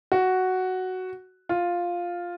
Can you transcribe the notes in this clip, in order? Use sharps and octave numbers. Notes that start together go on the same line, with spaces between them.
F#4
F4